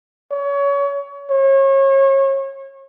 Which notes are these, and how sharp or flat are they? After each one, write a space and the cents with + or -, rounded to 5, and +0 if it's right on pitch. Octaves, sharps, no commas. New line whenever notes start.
C#5 +30
C#5 -35